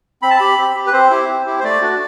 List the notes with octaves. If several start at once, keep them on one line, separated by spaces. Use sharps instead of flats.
C4 B5
A5
G4 B5
C4
G4
B4
C4 C5
E4 G4
C4
E4 G4
C5
A3 D5
D4 F#4